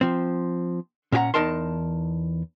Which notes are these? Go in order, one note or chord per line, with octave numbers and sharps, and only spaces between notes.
F3 C4
A#2 C#4 G4 G#4 F#5 A#5
E2 B3 D#4 A#4 A5 C6